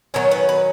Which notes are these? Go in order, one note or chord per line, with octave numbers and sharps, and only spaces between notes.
D#3 F#3 C#4 C#5
B4
B4